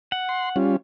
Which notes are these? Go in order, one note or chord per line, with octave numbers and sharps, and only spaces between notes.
F#5
C6
G3 C#4 F4